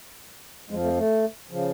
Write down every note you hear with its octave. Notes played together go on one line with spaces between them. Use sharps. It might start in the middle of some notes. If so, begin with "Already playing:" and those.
F2 F3 G#3
A3
A3
C#3 F3